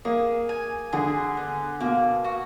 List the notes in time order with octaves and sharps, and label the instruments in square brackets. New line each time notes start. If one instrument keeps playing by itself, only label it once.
[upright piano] A#3 [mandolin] G#4
[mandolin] G#5
[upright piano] D3 [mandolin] G#4
[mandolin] B3
[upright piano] B2 [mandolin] A#3
[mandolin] F#4